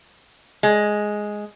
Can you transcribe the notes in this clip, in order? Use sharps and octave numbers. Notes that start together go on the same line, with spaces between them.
G#3